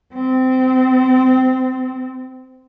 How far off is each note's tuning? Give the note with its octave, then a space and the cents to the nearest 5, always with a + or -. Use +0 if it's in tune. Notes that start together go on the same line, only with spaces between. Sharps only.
C4 -20